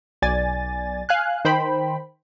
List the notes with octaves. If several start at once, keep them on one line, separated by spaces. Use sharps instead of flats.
B1 D5 G#5 A6
F5 G#5 F#6
D#3 C5 G5 B5